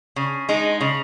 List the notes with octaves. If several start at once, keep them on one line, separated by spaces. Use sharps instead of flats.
C#3
G#3 D#4
C#3